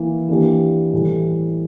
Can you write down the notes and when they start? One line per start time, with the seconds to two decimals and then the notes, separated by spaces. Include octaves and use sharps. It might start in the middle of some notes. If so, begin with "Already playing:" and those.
Already playing: E3 A#3 E4
0.29 E3 A#3 D4 G4
0.93 A2 E3 G3